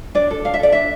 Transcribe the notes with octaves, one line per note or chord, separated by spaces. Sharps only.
D4 D5
A4
D4 F5
E5
A4 D5
D4 E5